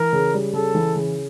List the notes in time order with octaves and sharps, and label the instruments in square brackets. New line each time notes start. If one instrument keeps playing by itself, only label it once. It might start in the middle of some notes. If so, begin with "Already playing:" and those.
Already playing: [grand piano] E3 [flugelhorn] A#4
[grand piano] C#3
G3
[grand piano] C#3 [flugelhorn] A4
[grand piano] E3
C#3